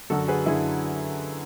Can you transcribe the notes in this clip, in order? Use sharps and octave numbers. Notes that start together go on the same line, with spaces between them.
F#2 D3 F#3 F#4 A4
G#4 B4
F#2 D3 F#3 E4 G#4